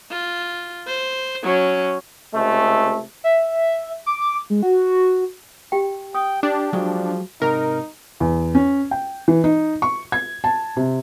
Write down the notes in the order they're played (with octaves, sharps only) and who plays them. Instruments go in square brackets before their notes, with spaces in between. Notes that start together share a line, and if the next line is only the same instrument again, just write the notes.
[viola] F4
C5
F#3 C#4
[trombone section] C#2 C3 A3
[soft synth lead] E5
D6
G#3
F#4
[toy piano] G4 G5
[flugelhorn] G5 [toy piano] D#6
[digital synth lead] D4 [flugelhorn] G4
[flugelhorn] F3 [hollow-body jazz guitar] F#3 G#3 G4
[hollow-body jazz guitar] G#2 C3 [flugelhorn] D#4 [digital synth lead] A#4
[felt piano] E2
C#4
G5
E3
D#4
C#6
G#6
A5
C3